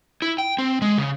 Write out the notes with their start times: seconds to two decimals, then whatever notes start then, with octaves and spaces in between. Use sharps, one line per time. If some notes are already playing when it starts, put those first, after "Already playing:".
0.22 E4
0.38 G5
0.58 C4
0.82 G#3
0.97 C#3